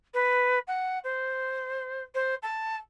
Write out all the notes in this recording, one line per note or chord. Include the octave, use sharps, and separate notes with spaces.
B4
F#5
C5
C5
A5